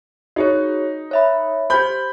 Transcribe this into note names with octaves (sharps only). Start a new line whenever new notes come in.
D#4 F#4 G#4 C#5
C#5 E5 B5
G4 C5 B5 G6